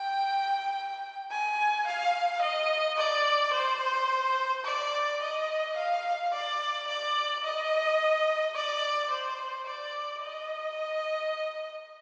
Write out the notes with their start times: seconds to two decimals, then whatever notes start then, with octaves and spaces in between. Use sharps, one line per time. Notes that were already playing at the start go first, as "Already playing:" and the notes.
Already playing: G5
1.31 G#5
1.87 F5
2.41 D#5
2.97 D5
3.53 C5
4.64 D5
5.21 D#5
5.76 F5
6.32 D5
6.87 D5
7.44 D#5
8.55 D5
9.10 C5
9.66 D5
10.22 D#5